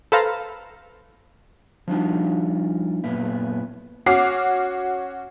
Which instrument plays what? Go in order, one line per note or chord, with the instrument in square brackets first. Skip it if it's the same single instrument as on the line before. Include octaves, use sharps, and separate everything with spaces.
[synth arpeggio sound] A4 B4 C5 F5 A#5
[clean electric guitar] F3 G3 D4 D#4 F4 F#4
F#2 A#2 B3 E4
[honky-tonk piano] C#4 F#4 D6 F6 C7